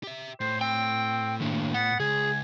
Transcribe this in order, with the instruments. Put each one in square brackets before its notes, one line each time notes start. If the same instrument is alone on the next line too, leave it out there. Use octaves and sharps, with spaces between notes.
[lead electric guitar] G4 E5
[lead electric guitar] A2 [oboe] C5
[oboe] C4 [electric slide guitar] G5
[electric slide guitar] D#3 A#3 D4
[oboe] B3 [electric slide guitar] F#5
[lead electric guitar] C#2 [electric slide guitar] G#4 [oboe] G#5